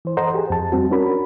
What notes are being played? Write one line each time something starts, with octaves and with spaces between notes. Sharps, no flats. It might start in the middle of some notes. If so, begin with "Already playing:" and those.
E3 C5
A4 C5 D#5 F#5 A#5
G4 G#4
F2 A5
G3 C4 F#4
C#4 D4 F#4 A#4 B5